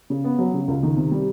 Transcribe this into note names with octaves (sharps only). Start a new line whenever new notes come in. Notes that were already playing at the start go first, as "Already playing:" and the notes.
C#3
B3
F#3
C#3
C#2
D#3
C3
G3